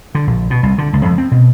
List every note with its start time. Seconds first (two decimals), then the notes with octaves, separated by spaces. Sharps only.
0.15 D3
0.27 A#1
0.50 B2
0.63 C2
0.78 D3
0.93 C#2
1.05 F2
1.18 C4
1.31 B2